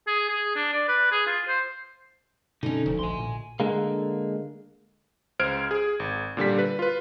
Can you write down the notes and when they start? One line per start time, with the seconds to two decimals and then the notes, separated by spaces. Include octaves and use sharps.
0.07 G#4
0.29 G#4
0.56 D4
0.73 D5
0.88 B4
1.12 G#4
1.27 F4
1.48 C5
2.63 B2 D3 C#4 D#4
2.86 E1 D2 F3
2.99 A#1 G#5 C6
3.19 A#2
3.60 D3 G#3 A#3
5.39 C#2 C5 F6 G#6 D7
5.71 G#4
6.00 G#1
6.37 A#2 D3 G3 B6
6.59 B4
6.79 F4 B4